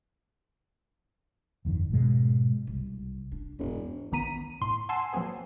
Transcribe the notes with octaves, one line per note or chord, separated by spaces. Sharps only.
G1 F2 D#3
G#2 B2 G#3
C2
D4
E1 F2 G#2
A#1 D#3 B3 A#5 B6 D#7
A2 C6
F#5 G#5 A5 C6 E6 C7
F3 F#3 A#3 C4 G#4 B4